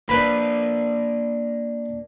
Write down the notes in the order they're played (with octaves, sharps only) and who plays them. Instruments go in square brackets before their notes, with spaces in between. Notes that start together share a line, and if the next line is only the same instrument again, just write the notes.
[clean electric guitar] A#3 D4 [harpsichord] B4 B5